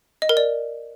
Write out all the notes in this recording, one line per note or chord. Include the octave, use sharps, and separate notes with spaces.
D#5
A#4
D5